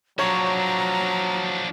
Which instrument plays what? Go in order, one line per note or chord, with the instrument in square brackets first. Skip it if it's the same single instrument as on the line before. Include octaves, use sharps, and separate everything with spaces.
[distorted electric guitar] F3 D4 [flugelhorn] F#3 [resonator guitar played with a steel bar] C#5 [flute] A#5